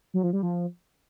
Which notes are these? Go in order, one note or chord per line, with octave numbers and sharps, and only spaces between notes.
F#3
F3
G3
F3